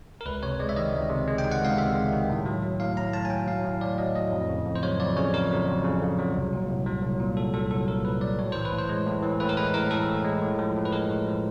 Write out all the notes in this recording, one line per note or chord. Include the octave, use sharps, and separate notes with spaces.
A#4
C#2 B4
C3 C#5
G#3 D5
E5
D#3 D#5
C#2
C3
G#3
G5
D#3
F#5
C#2 F5
C3 E5
G#3
D#3
A2
F#3
F#3
A2 F5
A2 A#5
F#3 A5
G#5
F#3 G5
A2 F5
A2
F#3 D5
F#3 D#5
A2 D#5
F2
C#3
F2
C5
F#3 C#5
F2 D5
C#3 C#5
F2 A#4
F#3
F2
C#3
F2
F#3
C2
A#2
C2
F#3
C2
A#2
C2 A4
F#3 A4
C2 A4
A#2 A#4
C2 B4
F#3 D5
A2 C#5
E3 C5
B4
A2
C5
G#3
A2
E3
A2 B4
A#4
G#3 B4
A2 A#4
E3 A4
A2
G#3
A2
F3
A2
B4
G#3 A#4
A2
F3